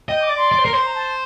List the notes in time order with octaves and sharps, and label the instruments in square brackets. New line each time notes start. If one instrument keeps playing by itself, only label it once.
[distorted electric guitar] D#5 [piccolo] G5
[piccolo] D6
[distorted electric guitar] D5
[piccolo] C6
[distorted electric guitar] D5
C5
A#4
[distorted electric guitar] C5 [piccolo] C6
[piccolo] A#5
A5